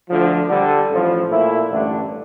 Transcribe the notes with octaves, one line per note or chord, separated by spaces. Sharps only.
D2 D3 F3
D3 G3 D4 A4
A1 A2 F3
A#2 A3 E4
A1 G2 D3 A3 D4